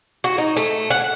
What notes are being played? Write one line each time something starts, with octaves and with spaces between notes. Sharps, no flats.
F#4
D#4
A3
F#5